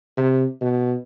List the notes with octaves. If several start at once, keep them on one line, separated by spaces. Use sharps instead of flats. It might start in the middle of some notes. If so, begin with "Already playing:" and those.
C3
B2